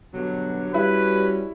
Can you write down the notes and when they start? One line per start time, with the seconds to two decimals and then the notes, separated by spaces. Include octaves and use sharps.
0.14 G2 B2 D3 F#3
0.74 G3 C#4 E4 F#4 B4